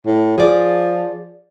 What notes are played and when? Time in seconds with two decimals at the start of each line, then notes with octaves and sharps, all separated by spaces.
0.06 A2
0.38 F3 G#4 D5